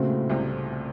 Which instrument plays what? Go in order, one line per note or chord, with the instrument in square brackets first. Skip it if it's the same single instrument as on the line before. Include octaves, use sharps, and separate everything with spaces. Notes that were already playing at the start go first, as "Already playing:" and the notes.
Already playing: [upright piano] A#2 [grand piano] C#3 A3 C4 F#4
[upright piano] A2
C2 C3